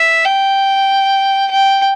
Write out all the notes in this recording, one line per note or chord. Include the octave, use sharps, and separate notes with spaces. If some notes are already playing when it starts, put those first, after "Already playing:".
Already playing: E5
G5
G5